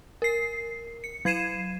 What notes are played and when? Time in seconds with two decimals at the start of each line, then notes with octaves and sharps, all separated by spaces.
0.22 A#4 C7
1.04 C#7
1.25 F#3 G#6 C7 D#7 E7